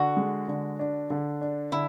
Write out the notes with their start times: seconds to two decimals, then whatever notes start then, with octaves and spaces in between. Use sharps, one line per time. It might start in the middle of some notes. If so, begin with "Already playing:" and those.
Already playing: D3 F#4
0.17 G#3
0.48 D3
0.79 D4
1.10 D3
1.41 D4
1.72 D3 E4